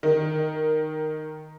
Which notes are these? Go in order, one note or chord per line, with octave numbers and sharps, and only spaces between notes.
D#3